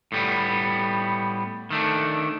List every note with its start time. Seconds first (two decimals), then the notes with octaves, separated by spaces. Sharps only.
0.12 A2 G3 B3
1.70 D#3 A3 D4